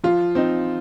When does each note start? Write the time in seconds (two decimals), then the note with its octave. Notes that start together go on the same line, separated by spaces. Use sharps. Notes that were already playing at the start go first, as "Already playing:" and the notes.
0.04 F3 F4
0.35 C4 D#4